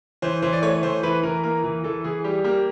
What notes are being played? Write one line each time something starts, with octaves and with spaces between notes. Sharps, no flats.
E3 C5
E3 C5
D5
A3 C#5
E3 C5
E3 B4
E3 A#4
A#3 A#4
E3
E3 A4
E3 G#4
G3 G4
A#3 G4